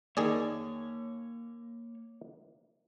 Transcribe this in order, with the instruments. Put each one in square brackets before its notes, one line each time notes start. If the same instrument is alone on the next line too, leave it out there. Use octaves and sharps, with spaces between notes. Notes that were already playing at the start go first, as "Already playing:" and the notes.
[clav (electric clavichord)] D#3 G#4 D5 [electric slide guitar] A#3 C#5